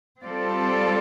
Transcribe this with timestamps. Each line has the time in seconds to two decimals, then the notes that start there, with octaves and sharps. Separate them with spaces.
0.23 G3 C4 F4 A4 D5